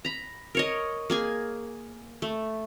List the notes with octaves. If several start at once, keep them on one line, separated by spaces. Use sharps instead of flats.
A#5 B5
A#4 C#5 D#5
A#3 G#4 G#5
A3